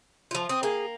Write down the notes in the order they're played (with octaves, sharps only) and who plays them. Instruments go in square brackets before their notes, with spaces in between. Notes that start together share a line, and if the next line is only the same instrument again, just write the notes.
[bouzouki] F3 F4
[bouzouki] C4 [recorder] D#6
[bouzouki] A#3 [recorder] G#4